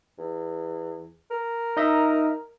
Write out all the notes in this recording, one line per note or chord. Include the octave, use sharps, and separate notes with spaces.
E2
A#4
D#4 D#5 E5